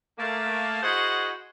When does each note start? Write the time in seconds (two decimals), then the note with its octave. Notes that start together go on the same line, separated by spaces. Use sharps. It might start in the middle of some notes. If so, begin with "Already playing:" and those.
0.19 A3 A#3
0.83 E4 F#4 G#4 C5 D#5 F#5